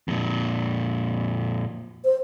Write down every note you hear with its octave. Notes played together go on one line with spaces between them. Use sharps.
F2 A#2
C5